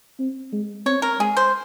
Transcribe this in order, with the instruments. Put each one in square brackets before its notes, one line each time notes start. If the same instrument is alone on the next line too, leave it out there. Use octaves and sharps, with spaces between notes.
[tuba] C4
G#3
[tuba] C4 [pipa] C#5
[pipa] A#4
[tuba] G#3 [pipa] G#4
[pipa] C5